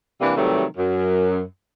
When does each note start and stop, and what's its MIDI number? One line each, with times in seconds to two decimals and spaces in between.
0.21 0.34 48
0.21 0.34 52
0.21 0.34 55
0.21 0.34 58
0.21 0.34 62
0.36 0.64 48
0.36 0.64 51
0.36 0.64 52
0.36 0.64 54
0.36 0.64 55
0.36 0.64 57
0.77 1.41 42